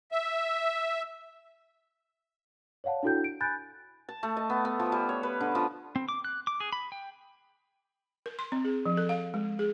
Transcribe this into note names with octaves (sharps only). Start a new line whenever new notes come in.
E5
C#5 D5 F5 F#5 A5
D4 E4 F#4 A4 G5 G6
D7
G#5 B5 F#6 G6 A6
A5
A3
D#5
B3
B3
F3
G3
C#5
B4
D3
F3
C4
D6
F#6
D6
G#4
B5
G5
A#4
C6
C4
G#4
F3
A4
F5
G#3
G#4